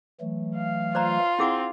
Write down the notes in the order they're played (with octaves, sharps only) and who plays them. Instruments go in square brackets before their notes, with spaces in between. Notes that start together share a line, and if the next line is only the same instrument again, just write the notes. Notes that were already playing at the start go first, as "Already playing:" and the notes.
[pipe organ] E3 F#3 A3
[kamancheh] F5
[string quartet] F4 [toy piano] C5 D5 A#5
[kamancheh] C4 [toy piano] E4 G#4 F#5